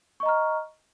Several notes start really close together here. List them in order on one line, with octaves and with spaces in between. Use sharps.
C#6 D#5 A#5 F6